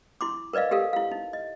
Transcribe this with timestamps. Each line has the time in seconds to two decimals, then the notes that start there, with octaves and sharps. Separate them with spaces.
0.21 E4 C6 D6
0.53 A#4 B4 D5 D#5 F5
0.71 G4 A4 A#4 F5
0.93 E4 F5
1.12 D#4
1.33 D#5